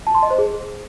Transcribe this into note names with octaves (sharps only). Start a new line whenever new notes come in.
A5
C6
D#5
C5
G#4